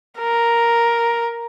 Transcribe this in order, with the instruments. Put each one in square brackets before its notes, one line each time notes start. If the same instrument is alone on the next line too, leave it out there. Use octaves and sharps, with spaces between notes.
[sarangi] A#4